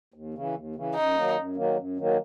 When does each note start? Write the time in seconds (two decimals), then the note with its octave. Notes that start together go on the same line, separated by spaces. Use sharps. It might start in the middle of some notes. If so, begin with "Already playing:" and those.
0.14 D#2
0.34 C#3 E3
0.55 D#2
0.75 C#3 E3
0.95 F#2 D#4
1.16 D#3 F#3 A#3
1.36 F#2
1.56 D#3 F#3 A#3
1.77 F#2
1.97 D#3 F#3 A#3